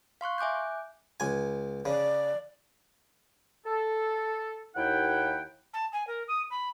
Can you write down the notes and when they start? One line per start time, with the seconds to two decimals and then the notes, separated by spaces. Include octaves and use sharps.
0.21 F5 C6 C#6 F#6
0.38 E5 G#5 D6 F#6 G6
1.20 C#2 G#5
1.85 C#3 D5
3.66 A4
4.76 D#2 E4 F#5 G5
5.73 A5
5.92 G#5
6.07 A#4
6.28 D#6
6.50 B5